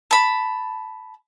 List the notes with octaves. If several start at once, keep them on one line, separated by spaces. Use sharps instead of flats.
A5 B5